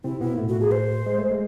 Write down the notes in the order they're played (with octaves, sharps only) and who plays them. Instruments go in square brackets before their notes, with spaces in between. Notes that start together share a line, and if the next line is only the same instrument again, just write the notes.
[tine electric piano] C3 C4 [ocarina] E4
[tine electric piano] B2 B3 [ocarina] E4
[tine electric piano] A#3
A2 A3
[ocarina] F#4
G#4
C5
[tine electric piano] G#3
A3
G#3